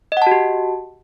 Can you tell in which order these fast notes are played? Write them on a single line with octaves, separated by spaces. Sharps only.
D#5 F#5 A5 F#4 G4